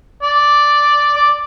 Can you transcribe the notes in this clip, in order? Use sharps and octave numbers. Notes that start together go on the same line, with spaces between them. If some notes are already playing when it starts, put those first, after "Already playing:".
D5
D5